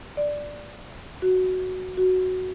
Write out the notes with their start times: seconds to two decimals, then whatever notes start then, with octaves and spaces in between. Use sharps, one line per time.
0.17 D5
1.22 F#4
1.97 F#4